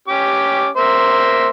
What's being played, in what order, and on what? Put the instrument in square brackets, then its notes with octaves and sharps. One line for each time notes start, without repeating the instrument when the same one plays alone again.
[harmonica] C#4 G4 D6
A#3 C5 E5